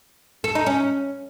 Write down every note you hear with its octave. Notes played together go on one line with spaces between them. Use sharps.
A4
D#4
C#4